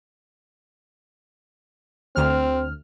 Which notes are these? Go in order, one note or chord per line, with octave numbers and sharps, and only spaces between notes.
D2 C4 F6